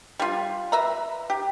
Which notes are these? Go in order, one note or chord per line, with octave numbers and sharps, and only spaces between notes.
G3 F4
B4 E5 A#5
G4